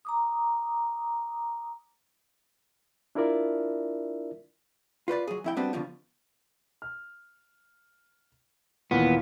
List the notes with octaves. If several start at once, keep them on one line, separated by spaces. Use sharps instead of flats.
A#5 D6 D#6
D4 E4 F4 A#4 D5 E5
F4 B4 C5 D5
F#3 G#4
F2 E4 G5
G3 B3 C4 D4 F#4 G4
F2 B2 D3 F3
F6
D#2 A#2 E3 B3